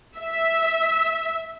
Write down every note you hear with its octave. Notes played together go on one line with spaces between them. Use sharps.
E5